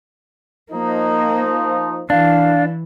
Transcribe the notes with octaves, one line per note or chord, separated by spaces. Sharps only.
F3 A#3 D#4
E3 D4 F5